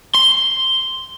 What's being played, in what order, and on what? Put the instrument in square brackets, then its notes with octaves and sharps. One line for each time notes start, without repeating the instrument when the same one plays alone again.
[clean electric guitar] C6